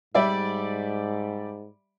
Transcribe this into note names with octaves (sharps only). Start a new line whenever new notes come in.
G#2 G3 D5 E5